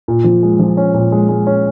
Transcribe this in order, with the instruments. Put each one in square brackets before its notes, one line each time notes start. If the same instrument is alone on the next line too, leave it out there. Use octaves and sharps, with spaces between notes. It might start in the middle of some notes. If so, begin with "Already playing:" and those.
[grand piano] A#2
F3
G#3
F3
C#4
A#2
G#3
G#3
C#4